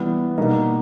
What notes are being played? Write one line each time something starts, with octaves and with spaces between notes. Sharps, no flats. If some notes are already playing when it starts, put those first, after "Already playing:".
Already playing: E3 G3 B3
B2 G3 A#3 D#4